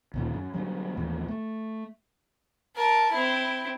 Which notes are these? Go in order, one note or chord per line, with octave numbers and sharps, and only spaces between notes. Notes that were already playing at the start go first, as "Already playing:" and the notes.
D2 A#2 D#3
F#2
D3 F#3 G3
D#2 A2 E3
A3
A#4 A5
C4 E4